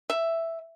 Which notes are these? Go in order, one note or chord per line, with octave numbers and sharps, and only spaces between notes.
E5